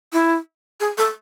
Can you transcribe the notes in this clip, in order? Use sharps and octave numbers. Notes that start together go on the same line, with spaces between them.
E4
G#4
A4